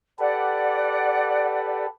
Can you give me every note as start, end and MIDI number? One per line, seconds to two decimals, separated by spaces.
0.19 1.87 67
0.19 1.87 69
0.19 1.87 71
0.19 1.84 74
0.19 1.84 78